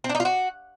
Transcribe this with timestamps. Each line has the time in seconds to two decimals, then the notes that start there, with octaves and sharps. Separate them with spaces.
0.04 C4
0.09 D4
0.15 D#4
0.20 F4
0.25 F#4